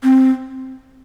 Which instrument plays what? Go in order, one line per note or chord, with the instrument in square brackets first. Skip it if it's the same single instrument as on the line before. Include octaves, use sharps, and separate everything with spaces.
[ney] C4